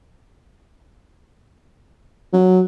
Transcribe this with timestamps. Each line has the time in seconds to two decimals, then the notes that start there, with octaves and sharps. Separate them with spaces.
2.33 F#3